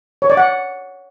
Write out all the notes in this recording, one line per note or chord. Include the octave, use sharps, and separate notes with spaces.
C#5
D5
F#5